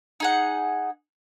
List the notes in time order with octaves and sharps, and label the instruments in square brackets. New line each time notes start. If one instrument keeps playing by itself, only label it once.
[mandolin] D#4 G#4 F#5